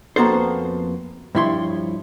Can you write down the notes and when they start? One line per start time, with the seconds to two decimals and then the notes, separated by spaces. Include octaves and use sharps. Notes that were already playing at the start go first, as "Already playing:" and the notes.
0.16 F2 A#3 B3 F#4 A4 C5
1.35 G2 F3 E4 C#5 C6